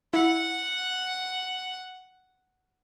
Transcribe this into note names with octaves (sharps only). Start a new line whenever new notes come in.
E4 F#5